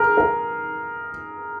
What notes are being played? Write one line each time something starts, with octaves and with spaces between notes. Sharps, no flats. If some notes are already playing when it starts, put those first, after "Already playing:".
Already playing: G#4 A#4
A#4